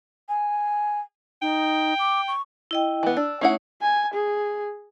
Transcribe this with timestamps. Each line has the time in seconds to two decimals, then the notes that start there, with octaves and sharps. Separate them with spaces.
0.29 G#5
1.42 D#4 G5
1.99 D6
2.28 C#6
2.71 E4 D#5 G5
3.03 E3 B3
3.17 D4 E6
3.41 A3 C#4 D#4 E4 C#5 F#5
3.82 G#5
4.14 G#4